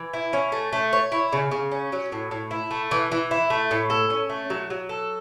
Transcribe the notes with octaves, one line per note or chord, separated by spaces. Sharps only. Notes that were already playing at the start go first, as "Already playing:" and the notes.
Already playing: E3
E4
C#4
A3
A3
C#5
E4
C#3
C#3
C#4
F#3
A2
A2
E4
A3
E3
E3
E4
A3
A2
A4
C#4
A3
F#3
F#3
A4